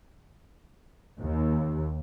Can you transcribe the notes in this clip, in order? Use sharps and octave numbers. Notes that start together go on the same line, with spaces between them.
D#2